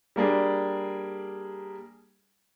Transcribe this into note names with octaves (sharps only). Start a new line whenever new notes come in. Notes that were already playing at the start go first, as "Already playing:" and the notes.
G3 A#3 D4 G#4